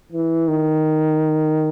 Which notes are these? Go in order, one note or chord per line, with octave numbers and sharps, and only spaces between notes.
E3
D#3